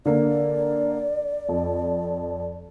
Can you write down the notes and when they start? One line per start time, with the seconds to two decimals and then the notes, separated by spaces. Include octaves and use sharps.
0.05 D3 A#3 D5
1.49 F2